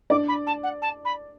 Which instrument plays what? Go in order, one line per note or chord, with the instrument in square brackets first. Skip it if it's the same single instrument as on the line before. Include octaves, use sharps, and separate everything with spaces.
[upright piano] D4 D5 [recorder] D6
[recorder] B5
A5
F#5
A5
B5